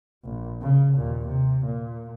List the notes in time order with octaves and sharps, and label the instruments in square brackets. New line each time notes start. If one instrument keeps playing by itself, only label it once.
[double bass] A#1
C#3
D#2 A#2
C3
A#2